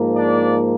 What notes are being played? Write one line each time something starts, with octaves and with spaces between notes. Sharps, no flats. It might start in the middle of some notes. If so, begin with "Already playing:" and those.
Already playing: G#2 F3 A#3
D4 D5